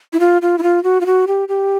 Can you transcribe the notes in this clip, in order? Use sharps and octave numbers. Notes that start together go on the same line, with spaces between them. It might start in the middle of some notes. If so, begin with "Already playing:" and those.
E4
F4
F4
E4
F4
F#4
F4
F#4
G4
G4